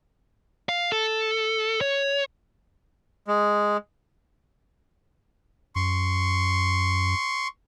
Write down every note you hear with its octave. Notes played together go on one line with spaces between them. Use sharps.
F5
A4
C#5
G#3
F#2 C6 C#6